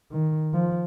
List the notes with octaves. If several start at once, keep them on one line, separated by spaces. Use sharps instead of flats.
D#3
F3